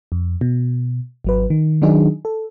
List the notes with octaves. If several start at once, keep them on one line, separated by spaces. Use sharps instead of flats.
F2
B2
G#1 F#3 B4
D#3
D#3 F#3 D4 D#4 G#4
A4